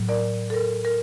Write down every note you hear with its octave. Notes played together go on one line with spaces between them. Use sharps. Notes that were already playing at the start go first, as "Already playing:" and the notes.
Already playing: A2 F#3
A#4 D5
A4
A#4
A#4